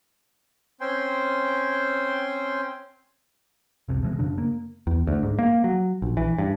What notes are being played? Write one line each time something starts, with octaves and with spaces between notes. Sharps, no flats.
C4 C#4 C5 G5 G#5 C6
F1 C2 C3
B2 E3 G#3
F#2 C#3 D4
A#3
E2
D2
G#2
A#3
F#3
A#1
E3
G2